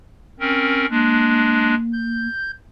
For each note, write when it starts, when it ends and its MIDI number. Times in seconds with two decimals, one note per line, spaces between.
0.40 0.86 60
0.40 0.86 61
0.40 0.86 70
0.90 1.75 56
0.90 2.27 58
0.90 1.75 62
1.93 2.51 91